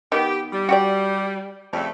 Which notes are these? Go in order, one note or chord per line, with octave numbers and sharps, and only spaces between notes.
D#3 B3 G4
G3
F#4 G4 D5
F2 C#3 G3 A3